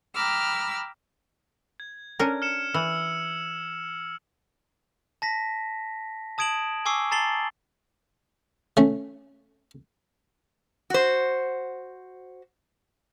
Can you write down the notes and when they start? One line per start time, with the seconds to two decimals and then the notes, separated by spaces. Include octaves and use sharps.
0.15 G5 A#5 B5 D6 E6 F6
1.80 G#6
2.19 C#4 D4 A#4
2.42 F6 C#7 E7
2.74 E3 E6
5.22 A5 A#6 B6
6.38 A5 D#6 G#6 D7 E7 F#7
6.86 G#5 C#6 D6 E6 C7
7.11 A5 A#5 A6 C7 F#7 G7
8.77 A3 C#4
10.90 F#4 C5